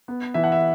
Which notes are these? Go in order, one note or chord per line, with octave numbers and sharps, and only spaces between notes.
B3
E3 E5
F#5
E5